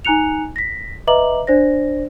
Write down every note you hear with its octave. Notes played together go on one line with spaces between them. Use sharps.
D#4 G#5 A#5 F#6 C#7 F7
A#6 B6
B4 D#5 E5 A#5 D6 F#7
D4 C5 D5 A#6